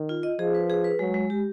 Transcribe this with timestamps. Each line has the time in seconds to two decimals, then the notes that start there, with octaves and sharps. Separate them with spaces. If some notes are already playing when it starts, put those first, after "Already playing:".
Already playing: D#3
0.09 F4
0.23 D#5
0.39 F3 G#4
0.54 B4
0.70 G#4
0.84 B4
0.99 F#3 G#3
1.14 G#3
1.30 G4